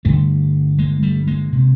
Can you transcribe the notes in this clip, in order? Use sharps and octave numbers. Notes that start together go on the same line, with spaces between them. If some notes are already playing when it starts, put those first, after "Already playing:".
G2 D3 G3 A3
G#3 A#3
G3 A3
G#3 A#3
C3